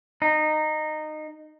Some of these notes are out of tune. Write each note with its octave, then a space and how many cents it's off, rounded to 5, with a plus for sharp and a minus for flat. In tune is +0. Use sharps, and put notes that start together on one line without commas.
D#4 -15